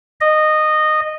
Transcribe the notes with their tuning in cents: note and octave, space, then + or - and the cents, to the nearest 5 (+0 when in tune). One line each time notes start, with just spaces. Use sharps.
D#5 -15